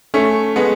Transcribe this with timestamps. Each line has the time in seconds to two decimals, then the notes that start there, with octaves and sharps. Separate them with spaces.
0.14 A3 C#4
0.56 G#3 B3